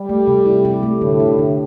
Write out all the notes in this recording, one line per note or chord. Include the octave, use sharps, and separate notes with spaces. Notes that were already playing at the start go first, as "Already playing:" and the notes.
Already playing: G3
A3
C3
E4
G4
A3
A2 D3
D4
D3